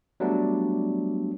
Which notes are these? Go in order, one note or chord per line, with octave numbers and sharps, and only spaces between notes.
F#3 G3 A3 B3 D4